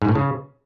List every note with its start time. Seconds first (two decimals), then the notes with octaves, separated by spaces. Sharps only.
0.02 G#2
0.08 A2
0.15 C#3